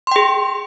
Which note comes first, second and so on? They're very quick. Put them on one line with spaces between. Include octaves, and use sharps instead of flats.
C6 G5 G#4